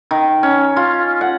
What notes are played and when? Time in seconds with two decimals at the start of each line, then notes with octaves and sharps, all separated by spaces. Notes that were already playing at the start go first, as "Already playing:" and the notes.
0.11 D#3
0.43 C#4
0.76 F4
1.21 F#5